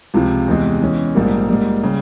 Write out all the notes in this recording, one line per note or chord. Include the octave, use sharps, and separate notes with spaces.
C#2 C3 F3
E2 C3 E3 G#3
E2 E3 G#3 C#4
A#1 G#2 G3 A#3
G#2 G3 A#3
C#3 G3